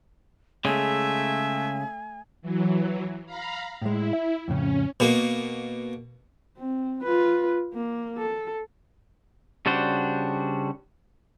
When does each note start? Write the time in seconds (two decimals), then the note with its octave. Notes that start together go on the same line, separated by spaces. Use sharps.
0.65 C#3 G#3 A3 E5 G#5
2.42 E3 F#3
3.26 F5 A#5 B5
3.82 A2 G#3 E4
4.13 E5
4.48 F2 A2 C#3 C#4
5.00 B2 A#3
6.58 C4
7.02 F4 B4
7.74 A#3
8.17 A4
9.66 C#3 G3 D4 F#4 C5